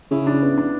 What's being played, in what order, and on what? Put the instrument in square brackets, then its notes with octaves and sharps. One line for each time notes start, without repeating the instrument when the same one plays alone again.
[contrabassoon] C#3 [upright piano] E4
[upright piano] D4
B3
D4